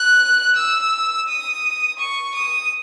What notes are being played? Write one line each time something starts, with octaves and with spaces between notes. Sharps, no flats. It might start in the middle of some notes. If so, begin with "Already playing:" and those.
Already playing: F#6
E6
D#6
C#6
D#6